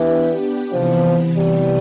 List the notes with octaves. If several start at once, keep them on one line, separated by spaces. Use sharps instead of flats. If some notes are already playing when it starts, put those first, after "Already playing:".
Already playing: E3 B3 D4 G4
C3 E3 F3 B3
G3